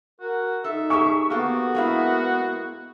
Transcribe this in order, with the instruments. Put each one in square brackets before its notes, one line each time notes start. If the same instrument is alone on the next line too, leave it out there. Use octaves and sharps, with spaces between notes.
[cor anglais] F#4 [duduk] A#4
[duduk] D#4 [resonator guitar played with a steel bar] A4 [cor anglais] E5
[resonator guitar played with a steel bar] G4 G#4 A5 [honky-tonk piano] C#6
[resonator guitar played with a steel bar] A#3 G4 A4 [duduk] B3 [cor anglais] F#4
[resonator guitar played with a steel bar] G#3 A#3 E4